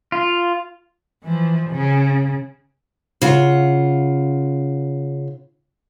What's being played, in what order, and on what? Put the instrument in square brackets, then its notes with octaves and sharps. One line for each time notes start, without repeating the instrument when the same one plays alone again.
[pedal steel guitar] F4
[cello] E3 F3
C#3
[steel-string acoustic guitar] C#3 F4 F#5